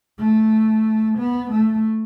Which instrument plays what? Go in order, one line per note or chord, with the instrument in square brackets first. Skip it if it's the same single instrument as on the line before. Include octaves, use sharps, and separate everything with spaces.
[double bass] A3
B3
A3